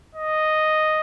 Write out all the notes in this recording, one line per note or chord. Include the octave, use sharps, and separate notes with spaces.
D#5